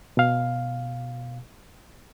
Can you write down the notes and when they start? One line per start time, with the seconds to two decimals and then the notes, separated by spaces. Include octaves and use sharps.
0.17 B2 F5